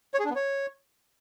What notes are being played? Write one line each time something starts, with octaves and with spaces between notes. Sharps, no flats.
C#5
G#4
D4
B3
C#5